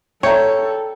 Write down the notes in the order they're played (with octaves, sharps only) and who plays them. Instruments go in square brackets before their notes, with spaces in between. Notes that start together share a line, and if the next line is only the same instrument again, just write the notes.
[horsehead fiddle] A4 [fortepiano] C#5 [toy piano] D5 E5 A#5 [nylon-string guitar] G5